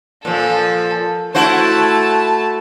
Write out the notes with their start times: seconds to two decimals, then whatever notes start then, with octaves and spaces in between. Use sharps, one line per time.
0.25 A#2 F3 A4
1.35 A3 E4 F#4 C5 A5